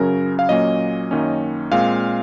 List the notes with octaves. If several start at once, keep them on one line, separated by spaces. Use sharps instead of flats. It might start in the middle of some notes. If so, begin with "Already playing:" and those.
Already playing: F#2 C#3 F#3 C#4 A#4
F5
A#2 F#3 A#3 C#4 D#5
F#2 D#3 A#3 C#4
A#2 G#3 C4 F5